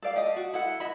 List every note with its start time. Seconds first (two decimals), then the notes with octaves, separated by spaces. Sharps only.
0.02 A4 C5 D5 F5
0.16 G4 A4 D#5
0.36 F#4
0.53 E4 A4 F#5
0.80 E4 D#5 E5 B5